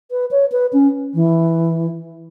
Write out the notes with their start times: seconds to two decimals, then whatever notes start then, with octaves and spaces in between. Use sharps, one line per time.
0.11 B4
0.31 C#5
0.52 B4
0.73 C#4
1.14 E3